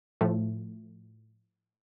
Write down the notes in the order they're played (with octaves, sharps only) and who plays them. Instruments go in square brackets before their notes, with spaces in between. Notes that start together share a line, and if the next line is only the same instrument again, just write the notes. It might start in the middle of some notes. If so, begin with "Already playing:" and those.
[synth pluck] A2 F3 A3